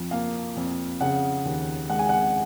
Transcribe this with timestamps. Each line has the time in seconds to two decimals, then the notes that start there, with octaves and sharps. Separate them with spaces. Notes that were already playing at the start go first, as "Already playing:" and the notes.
Already playing: F2 F3
0.11 A#3 F5
0.56 F2
1.00 C#3 F#5
1.45 D#2
1.89 G#3 F#5
1.99 G#5
2.09 F#5